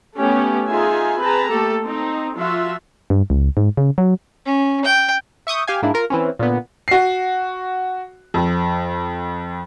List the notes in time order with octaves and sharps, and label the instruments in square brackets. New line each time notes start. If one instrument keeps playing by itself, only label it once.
[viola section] A3 B3 C#4 G4
D#4 F4 G#4 E5 G#5
C4 G#4 B4 A5 A#5
A3 A#3 G4 A4
C4 D#4
F3 F4 F#4 E5
[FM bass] G2
C#2
G#2
C#3
F#3
[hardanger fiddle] C#4
G5
[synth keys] E5 C#6 D#6 G6
G4 F5 G#5
G#2 A#3 D4 E4
F4 A#4
E3 C4 C#4
A#2 D3 B3
[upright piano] F#4 C7
F2